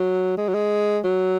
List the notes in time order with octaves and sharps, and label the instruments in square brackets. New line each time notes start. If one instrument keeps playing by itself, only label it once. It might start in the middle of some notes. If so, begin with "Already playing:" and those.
Already playing: [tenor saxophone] F#3
G#3
F#3
G#3
F#3